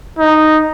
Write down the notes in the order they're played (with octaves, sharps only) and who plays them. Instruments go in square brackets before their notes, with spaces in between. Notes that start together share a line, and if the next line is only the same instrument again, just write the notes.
[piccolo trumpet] D#4